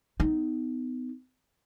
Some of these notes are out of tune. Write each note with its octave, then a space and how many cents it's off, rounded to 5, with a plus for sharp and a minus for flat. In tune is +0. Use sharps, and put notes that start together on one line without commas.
B3 +35 D#4 +0